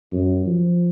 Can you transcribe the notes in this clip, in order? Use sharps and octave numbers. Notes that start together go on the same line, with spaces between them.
F#2
F3